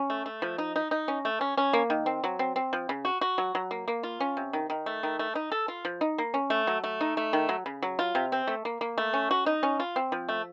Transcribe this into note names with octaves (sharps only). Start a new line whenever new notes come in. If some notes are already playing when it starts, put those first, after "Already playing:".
Already playing: C#4
A3
A3
F3
D#4
D#4
D#4
C#4
A3
C#4
C#4
A#3
D#3
C4
F#3
C4
C4
F3
C#3
F#4
F#4
F#3
F#3
A#3
A#3
F4
C#4
C3
D#3
D#3
A3
D#3
A3
D#4
A4
F4
F3
D#4
A#3
C#4
A3
F#3
A3
D#4
A3
D#3
F#3
C#3
F#3
F4
C3
C4
A3
A#3
A#3
A3
C#4
F#4
D#4
C#4
F4
C4
F3
A3